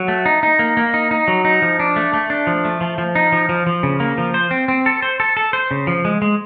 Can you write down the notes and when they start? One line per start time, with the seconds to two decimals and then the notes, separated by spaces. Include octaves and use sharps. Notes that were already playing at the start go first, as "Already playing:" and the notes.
Already playing: F#3
0.08 A3
0.26 D#4
0.43 D#4
0.59 A#3
0.77 A#3
0.94 D#4
1.11 D#4
1.28 F#3
1.45 D#4
1.62 F3
1.79 D4
1.96 A3
2.14 A3
2.30 D4
2.47 F3
2.65 A3
2.81 F3
2.98 F3
3.15 D#4
3.32 F3
3.49 F3
3.67 F3
3.83 C#3
4.00 A#3
4.18 F3
4.34 C5
4.51 C4
4.68 C4
4.86 A4
5.02 C5
5.20 A4
5.37 A4
5.53 C5
5.71 C#3
5.87 F3
6.05 G#3
6.22 G#3